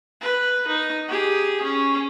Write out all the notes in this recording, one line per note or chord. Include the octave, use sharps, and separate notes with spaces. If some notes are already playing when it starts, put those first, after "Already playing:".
B4
D#4
G4 G#4
C#4